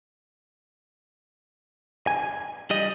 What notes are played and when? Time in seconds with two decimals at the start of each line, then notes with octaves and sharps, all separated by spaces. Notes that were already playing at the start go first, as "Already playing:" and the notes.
2.07 G#5
2.70 G3 D#5